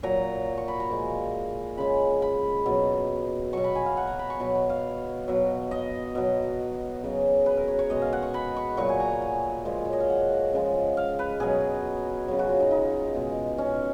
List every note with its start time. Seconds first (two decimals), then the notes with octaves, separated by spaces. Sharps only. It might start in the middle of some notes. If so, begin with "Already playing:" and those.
0.03 A#2 F#3 A#5
0.57 C#6
0.68 B5
0.80 A#5
0.90 A#2 F3 G#3
1.77 C#3 G#3 B5
2.22 B5
2.66 B2 F#3
3.53 B2 F#3 C#6
3.64 B5
3.75 G#5
3.86 F5
3.97 F#5
4.07 A#5
4.19 B5
4.30 C#6
4.40 B2 F#3 B5
4.55 B5
4.70 F5
5.28 B2 F#3
5.71 D#5
6.15 B2 F#3
7.03 C#3 F#3
7.46 B4
7.57 A#4
7.68 C#5
7.79 C#5
7.90 B2 G#3 D#5
8.02 F5
8.13 F#5
8.23 C#6
8.34 B5
8.56 C#6
8.77 A#2 F#3 C#6
8.89 G#5
9.00 A#5
9.22 G#5
9.65 A#2 F3 G#3
9.85 C#5
9.93 D#5
10.00 F5
10.10 F#5
10.53 C#3 F3 G#3
10.97 F5
11.19 B4
11.40 B2 F#3 G#4
12.28 C#3 F#3
12.39 F#4
12.49 F4
12.60 D#4
12.71 D#4
13.15 B2 G#3
13.58 C#4